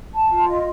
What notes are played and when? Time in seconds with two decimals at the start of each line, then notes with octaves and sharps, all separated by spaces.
0.15 A5
0.31 F4
0.48 D#5